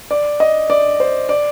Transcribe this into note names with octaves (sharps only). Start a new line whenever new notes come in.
D5
D#5
D5
C5
D5